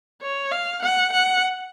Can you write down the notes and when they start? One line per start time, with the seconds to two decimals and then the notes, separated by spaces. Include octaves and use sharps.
0.22 C#5
0.52 F5
0.83 F#5
1.13 F#5